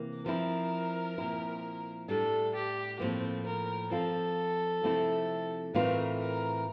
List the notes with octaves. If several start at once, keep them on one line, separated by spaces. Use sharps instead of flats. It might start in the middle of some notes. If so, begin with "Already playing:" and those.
Already playing: C3 E3 A#3
F3 C4 E4 A#4
A#2 F3 C4 E4
A2 G3 D4 A4
G4
A2 F3 A#3 C4
A#4
F3 C4 F4 A4
C3 F3 A3 C4 E4
A2 E3 A3 C4 F4 A#4
A#4